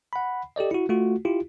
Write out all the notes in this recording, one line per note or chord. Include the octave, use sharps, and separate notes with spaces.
F#5 B5
G4 A4 D5 D#5
E4 F#4
A3 F4 F#4
E4 F4 G4